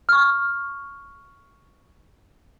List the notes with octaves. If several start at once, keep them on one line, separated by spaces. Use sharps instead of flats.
C#6 F6